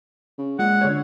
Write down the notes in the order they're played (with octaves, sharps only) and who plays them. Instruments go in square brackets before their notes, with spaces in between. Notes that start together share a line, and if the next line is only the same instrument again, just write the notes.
[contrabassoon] C#3
[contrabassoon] A#2 [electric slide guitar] G#3 [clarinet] F#5
[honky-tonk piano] D3 C#5